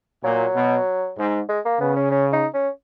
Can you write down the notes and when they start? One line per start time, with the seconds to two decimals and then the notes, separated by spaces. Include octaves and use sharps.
0.24 A#2 F#3
0.55 B2
1.18 G#2
1.49 G#3
1.65 A#3
1.80 C#3 B3
1.96 C#4
2.11 C#4
2.33 D#4
2.54 C#4